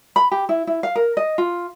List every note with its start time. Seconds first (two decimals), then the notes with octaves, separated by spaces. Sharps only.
0.16 B5
0.32 G4
0.49 E4
0.67 E4
0.83 F5
0.96 A#4
1.17 D#5
1.38 F4